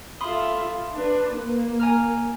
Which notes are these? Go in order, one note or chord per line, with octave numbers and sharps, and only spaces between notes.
F4 A4 E5 B5 C6 D#6
D4 B4
A#3
G#5 A#5 F6